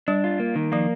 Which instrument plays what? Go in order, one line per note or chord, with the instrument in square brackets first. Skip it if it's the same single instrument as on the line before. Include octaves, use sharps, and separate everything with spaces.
[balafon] G3 [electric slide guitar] D4
[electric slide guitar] F4
A#3
D#3
[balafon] F3 [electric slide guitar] A#3